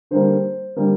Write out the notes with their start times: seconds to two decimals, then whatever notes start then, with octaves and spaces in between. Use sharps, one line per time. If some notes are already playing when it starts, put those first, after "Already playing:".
0.11 D3 G3 A#3 C5
0.76 D3 G3 A#3